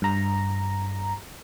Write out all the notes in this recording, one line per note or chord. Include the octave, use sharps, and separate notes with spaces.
G2 A#5